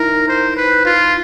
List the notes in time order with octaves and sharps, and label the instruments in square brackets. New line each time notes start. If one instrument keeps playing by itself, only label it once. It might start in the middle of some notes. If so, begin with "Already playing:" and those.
Already playing: [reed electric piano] D#4 E4 [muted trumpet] A#4
[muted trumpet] C5
B4
F4